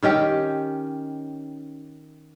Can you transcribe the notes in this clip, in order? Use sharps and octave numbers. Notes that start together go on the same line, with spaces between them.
D#3 C#4 G4 A4 D#5 G5